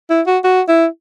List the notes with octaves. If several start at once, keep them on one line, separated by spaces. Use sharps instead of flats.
E4
F#4
F#4
E4